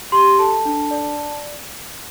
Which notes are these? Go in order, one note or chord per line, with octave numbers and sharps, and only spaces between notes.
G4 C6
A4 A5
D4
D5